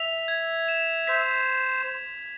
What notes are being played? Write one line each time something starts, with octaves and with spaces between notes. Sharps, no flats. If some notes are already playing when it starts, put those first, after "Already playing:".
Already playing: E5 F7
G#6
E7
C5 B6